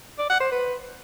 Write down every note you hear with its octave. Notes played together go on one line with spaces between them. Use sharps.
D5
F#5
C5
B4